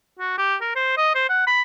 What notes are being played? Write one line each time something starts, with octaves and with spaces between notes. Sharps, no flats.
F#4
G4
A#4
C5
D#5
C5
F#5
B5